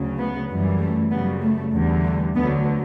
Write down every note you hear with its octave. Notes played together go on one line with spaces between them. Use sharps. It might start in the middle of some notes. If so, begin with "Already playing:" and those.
Already playing: D2 C#3 F#3
B3
F#2 E3 G3
A3
F#2 C#3 G3 B3
A3
E2 D3 G3
A3
D2 D3 F#3 B3